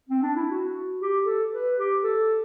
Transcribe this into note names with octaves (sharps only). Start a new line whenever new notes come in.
C4
D4
E4
F#4
G4
A4
B4
G4
A4